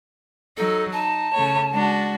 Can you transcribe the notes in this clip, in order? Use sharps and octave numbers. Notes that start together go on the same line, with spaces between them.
F#3 D#4 A4
D#4 A5
C#3 A3 C#5
G#3 D4 F#4